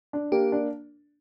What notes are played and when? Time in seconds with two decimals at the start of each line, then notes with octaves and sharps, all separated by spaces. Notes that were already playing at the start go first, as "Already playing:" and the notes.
0.13 D4
0.32 A#3 G4
0.52 D4